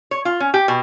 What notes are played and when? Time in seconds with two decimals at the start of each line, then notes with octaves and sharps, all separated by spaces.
0.11 C#5
0.25 F4
0.40 C#4
0.54 G4
0.68 B2